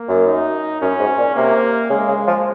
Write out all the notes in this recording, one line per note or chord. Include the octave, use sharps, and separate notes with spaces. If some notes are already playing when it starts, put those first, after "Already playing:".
Already playing: A#3
F#2
D#4
F#2 C#4
G#2
A#2
C3 A#3
C#3 G#3
C#3
F3